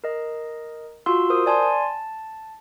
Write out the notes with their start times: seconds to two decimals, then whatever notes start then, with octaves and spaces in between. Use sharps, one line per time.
0.04 A#4 D#5
1.06 F4 F#4 F5 C6 E6
1.30 A#4 C5 D#6
1.46 D5 G#5 A5 C6
1.63 A5